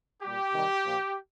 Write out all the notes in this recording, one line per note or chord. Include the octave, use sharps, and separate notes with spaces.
A#2 G3 G4
C3 D#3 G3
A#2 F3